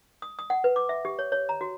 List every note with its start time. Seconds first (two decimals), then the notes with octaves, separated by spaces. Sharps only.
0.22 D#6
0.39 D#6
0.50 F#5
0.64 B4
0.76 D6
0.89 E5
1.05 G4
1.19 C#5
1.32 C#5
1.49 A#5
1.61 F#4